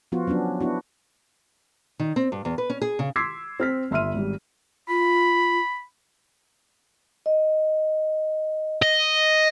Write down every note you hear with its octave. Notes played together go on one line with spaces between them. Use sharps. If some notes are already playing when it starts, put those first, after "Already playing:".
F3 B3 F4 F#4
F#3 B3 C#4 D4
B3 D4 E4 F#4
D#3
C4
G2
E2
B4
C#4
G#4
C#3
C6 D6 E6 G#6 B6 C7
C4 F6 B6
G1 E5 C6 F6 D#7
G#1 G3
F4 B5
D#5
D#5